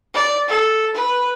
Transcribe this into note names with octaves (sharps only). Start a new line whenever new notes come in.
D5
A4
B4